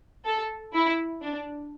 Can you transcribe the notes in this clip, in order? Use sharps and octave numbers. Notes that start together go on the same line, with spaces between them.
A4
E4
D4